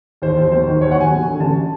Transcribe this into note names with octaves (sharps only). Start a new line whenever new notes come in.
D#2 C5
D#2
F#3 C5
D#3
D#2 C#5
F#5
D#2 G#5
F#3
D3
A1 A5